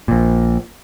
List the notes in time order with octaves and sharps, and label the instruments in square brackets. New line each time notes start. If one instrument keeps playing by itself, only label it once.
[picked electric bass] A#1 A#2